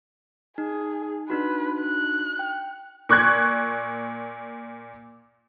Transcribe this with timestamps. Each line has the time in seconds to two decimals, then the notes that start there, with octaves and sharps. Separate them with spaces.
0.58 D#4 G#4
1.30 D4 D#4 F#4 B4
1.81 F#6
2.39 G5
3.09 A#2 C#6 F#6 G#6